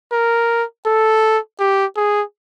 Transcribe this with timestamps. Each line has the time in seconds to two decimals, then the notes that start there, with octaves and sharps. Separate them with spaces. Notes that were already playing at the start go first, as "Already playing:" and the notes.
0.12 A#4
0.86 A4
1.59 G4
1.97 G#4